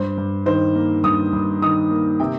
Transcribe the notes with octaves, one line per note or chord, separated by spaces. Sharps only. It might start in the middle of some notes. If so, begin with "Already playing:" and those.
Already playing: G2 C5
G2
D#3 C5
A#3
G2 D#6
G2
D#3 D#6
A#3
C3 G5